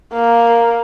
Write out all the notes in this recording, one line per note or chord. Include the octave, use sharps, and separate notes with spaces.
A#3